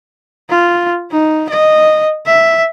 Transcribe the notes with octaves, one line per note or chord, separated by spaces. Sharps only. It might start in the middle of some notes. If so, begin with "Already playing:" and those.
F4
D#4
D#5
E5